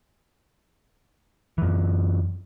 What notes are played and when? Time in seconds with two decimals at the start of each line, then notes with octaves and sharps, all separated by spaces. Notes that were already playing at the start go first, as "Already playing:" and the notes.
1.58 F#2 E3